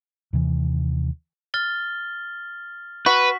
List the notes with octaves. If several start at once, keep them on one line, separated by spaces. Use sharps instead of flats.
D#2 C3 E3
F6 A6 G7
F#4 B4 B6